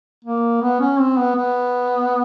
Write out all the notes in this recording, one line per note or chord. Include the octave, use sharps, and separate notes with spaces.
A#3
B3
C#4
C4
B3
B3